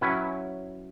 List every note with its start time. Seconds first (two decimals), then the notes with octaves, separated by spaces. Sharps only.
0.01 F#3 C#4 E4 B4